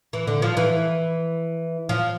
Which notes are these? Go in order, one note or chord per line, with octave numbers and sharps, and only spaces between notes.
E3
D3
F3
E3
F3